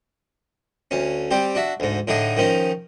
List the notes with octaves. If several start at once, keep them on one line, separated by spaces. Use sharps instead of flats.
D2 C#4
G3 C4 G4
D4 F#4 E5
D2 G#2
A2 D3 D4 D#4 G#4
D#3 F3 C#4 D#4